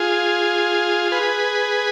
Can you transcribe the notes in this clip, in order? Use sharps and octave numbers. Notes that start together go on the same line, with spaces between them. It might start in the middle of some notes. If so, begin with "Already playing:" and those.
Already playing: F4 G#4
G#4 B4